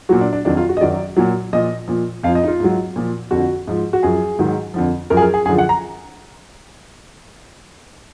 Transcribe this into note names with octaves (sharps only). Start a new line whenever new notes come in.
A#2 F#3 F#4
D4
D4
F2 D#3 F#3 D4
F4
F#4
D#5
F#2 D#3 F#3 D5
A#2 F#3
A#2 F3 D#5
A#2 F3
F2 F3 F5
D#5
D#4
F4
G#2 F#3
A#2 F3
F2 D3 F3 F#4
G#2 F3
F#4
F#2 F3 G#4
G#2 D#3 F#3
F2 D3 F3
F#2 F3 A#4
G#4
A#4
G#4
F#2 D3 F3 G#4
F#5
A#5